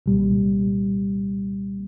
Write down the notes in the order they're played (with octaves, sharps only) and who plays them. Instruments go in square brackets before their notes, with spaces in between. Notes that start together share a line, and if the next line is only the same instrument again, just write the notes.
[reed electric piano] C2 A#2 G3